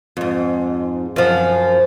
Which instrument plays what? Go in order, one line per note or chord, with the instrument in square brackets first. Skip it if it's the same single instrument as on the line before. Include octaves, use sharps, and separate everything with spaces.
[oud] F2 G#2
F#2 F3